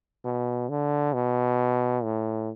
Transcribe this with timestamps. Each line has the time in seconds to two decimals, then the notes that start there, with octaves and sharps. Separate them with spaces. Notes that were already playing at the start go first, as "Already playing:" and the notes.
0.24 B2
0.69 D3
1.14 B2
2.03 A2